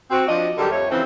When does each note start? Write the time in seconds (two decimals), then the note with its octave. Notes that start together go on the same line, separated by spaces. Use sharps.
0.11 C4 F#4
0.28 F3 D4 D#5
0.58 D3 F#3 G3 G4 A4 A#4
0.70 F2 A3 C#5
0.90 C#3 E3 F3 C4